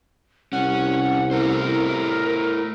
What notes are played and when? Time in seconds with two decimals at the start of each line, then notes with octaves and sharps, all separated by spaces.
0.53 C2 C#4 F#5
1.31 A3 E4 A#4 C5